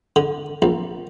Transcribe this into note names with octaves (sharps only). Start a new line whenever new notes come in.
D3
A#1